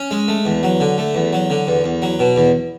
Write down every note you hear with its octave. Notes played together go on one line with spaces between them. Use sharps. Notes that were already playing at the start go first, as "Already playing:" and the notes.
Already playing: C#4
G#3
A3
E2
F#3
D3
A3
E2
F#3
D3
E2
E2
F#3
B2
E2